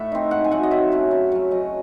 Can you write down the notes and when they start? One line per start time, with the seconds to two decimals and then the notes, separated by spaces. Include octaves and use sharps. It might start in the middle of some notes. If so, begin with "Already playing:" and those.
Already playing: A2 A3 E5 F#5
0.12 C4 D#4
0.31 G#2 F#5
0.44 G#5
0.51 F#3 A3 D#4 F#5
0.63 D#5
0.71 D#3 E5
0.92 F#3 A3 C#4
1.11 C#3
1.32 F#3 C#4
1.51 F#2 D#5